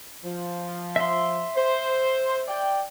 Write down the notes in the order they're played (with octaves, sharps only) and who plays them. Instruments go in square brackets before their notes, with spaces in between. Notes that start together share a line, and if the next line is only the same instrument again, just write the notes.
[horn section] F3
[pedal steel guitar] E5 C6
[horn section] C5
D5 G5